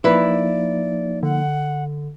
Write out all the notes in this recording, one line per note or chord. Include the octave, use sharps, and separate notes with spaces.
F3 A#3 D#4 E4 B4 D5
D3 F#5